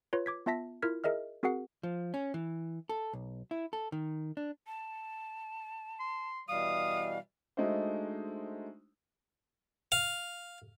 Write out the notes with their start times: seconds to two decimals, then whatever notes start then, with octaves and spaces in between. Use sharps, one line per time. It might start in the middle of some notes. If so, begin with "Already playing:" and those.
0.13 F4 B4 C#5
0.26 D6 G#6 B6
0.46 B3 F4 E5 A5 A#6 B6
0.82 E4 F4 A#4 F6 G#6 B6
1.04 G#4 A#4 D#5 E5 F6
1.43 C4 F#4 G#4 A#4 F#5 C7
1.83 F3
2.14 C#4
2.34 E3
2.89 A4
3.13 B1
3.51 E4
3.73 A4
3.92 D#3
4.37 D4
4.67 A5
6.00 C6
6.49 B2 E3 G3 F5 D#6
7.57 G#3 A3 D4 D#4 F#4 C5
9.92 F5